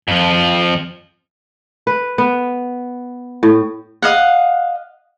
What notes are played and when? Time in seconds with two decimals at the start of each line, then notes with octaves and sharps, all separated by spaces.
0.08 F2 F3
1.87 B4
2.18 B3
3.43 A2
4.02 D#5 F5 F#5